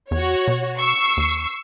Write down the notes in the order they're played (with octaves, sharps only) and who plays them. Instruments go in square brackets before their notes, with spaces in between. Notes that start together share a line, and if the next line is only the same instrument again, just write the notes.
[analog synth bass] E2 [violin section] F#4 C#5
[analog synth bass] B2
[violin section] C#6 E6 C7
[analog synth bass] D#2